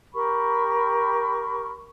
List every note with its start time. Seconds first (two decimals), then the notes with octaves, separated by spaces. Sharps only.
0.13 G4 A#4 B5 C#6